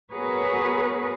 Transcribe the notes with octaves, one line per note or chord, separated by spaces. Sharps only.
B3 F#4 G#4 A#4 B4 C#5